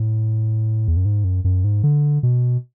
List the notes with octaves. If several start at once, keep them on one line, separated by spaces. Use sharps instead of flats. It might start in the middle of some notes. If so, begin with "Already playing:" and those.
Already playing: A2
E2
F#2
G#2
F#2
F#2
G#2
D3
B2